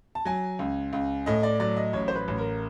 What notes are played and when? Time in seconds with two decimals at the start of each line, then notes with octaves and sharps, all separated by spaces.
0.15 A5
0.25 F#3 G#5
0.59 C#2
0.93 C#2
1.26 A2 D#5
1.43 D5
1.60 F#3 D5
1.77 D#5
1.93 A1 C#5
2.08 C5
2.16 B4
2.28 A1
2.38 A#4